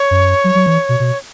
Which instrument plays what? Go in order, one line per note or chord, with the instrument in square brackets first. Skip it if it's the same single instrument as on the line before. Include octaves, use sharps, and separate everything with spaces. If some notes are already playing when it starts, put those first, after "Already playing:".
Already playing: [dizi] C#5
[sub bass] F#2
F#3
F#3
E3
B2
B2